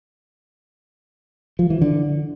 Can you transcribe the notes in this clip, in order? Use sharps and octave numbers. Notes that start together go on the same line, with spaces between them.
F3
E3
D3